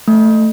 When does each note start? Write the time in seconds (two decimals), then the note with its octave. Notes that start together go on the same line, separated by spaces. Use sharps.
0.08 A3